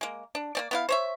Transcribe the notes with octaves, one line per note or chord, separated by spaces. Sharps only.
G#3 A#3
D4
A#3 C4 D5
B3 E4 F5
C5 C#5 E5